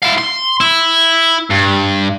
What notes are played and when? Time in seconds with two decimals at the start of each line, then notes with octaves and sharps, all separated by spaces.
0.02 E4 F5
0.18 C6
0.60 E4
1.50 G2